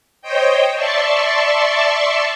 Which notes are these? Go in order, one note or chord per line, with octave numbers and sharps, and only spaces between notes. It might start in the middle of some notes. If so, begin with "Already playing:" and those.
C5 C#5 D#5 G5
D5 E5 A5 C6 C#6